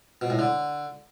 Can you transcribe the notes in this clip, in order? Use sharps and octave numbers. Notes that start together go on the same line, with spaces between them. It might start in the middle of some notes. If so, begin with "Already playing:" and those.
B2
A2
D3